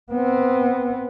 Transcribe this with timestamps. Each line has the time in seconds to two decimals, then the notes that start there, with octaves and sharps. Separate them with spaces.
0.12 B3 C4